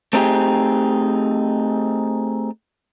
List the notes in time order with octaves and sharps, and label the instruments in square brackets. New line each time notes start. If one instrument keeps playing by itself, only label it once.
[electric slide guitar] A3 C4 D#4 F4 G4 G#4